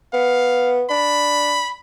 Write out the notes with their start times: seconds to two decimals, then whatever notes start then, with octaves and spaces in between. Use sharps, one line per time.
0.13 B3 F5
0.90 D4 B5